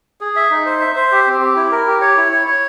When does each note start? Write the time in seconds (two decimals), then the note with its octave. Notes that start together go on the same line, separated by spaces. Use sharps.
0.21 G#4
0.36 E5
0.51 D#4
0.66 C5
0.81 E5
0.96 C5
1.12 G4
1.27 C4
1.41 G4
1.56 E4
1.72 A#4
1.87 G4
2.01 C#5
2.17 E4
2.32 C#5
2.47 C#5